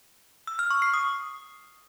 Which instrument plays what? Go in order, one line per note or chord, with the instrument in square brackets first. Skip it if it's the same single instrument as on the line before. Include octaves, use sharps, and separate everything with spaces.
[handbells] E6
F6
C#6
C7
D#6